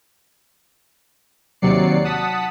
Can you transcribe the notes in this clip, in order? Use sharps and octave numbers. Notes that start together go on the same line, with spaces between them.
D#2 C3 F#3 D5 C7 C#7
F#5 A5 D#6 B6